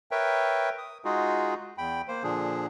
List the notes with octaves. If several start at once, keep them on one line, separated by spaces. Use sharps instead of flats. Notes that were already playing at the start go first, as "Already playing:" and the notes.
A#4 B4 C#5 E5 G5
D#6
G#3 D#4 F4 F#4 G#4
E2 G5 B5
A#3 C5
A#2 D3 F3 D4 G#4